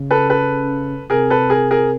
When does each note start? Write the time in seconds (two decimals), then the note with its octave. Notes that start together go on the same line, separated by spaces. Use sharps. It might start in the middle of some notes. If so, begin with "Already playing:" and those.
Already playing: C#3
0.11 A4 B4
0.30 A4 B4
1.10 C3 G#4 A#4
1.30 A4 B4
1.50 G#4 A#4
1.71 G#4 A#4